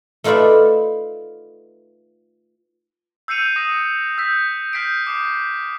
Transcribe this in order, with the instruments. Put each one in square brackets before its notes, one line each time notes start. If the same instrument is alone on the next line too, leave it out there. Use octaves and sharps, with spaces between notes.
[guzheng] A3 D#4 F4 B4 D5 E5
[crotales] E6 G6 C7 C#7 D#7 F7
D#6 A#6 D#7
E6 G6 B6
F6 G6 B6 C7 D7
D6 D#6 C7